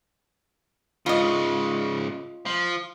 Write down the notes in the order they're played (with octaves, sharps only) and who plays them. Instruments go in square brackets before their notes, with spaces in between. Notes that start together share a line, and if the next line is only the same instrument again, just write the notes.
[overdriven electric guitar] G#2 C#3 [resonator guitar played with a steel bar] F4 D#5
[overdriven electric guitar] F3